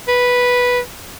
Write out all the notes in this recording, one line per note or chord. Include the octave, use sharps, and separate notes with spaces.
B4